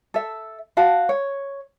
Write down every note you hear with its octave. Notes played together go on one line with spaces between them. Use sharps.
A4 E5
F#4 F5 A5
C#5